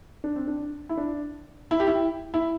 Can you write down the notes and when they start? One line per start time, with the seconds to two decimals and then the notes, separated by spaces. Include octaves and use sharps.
0.24 D4
0.36 C4
0.47 D4
0.89 E4
0.97 D4
1.71 E4
1.80 G4
1.87 E4
2.34 E4